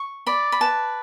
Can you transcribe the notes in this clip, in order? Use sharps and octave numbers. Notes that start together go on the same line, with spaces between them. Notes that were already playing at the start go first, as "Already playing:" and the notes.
Already playing: C#6
D5 B5
B5
B4 A5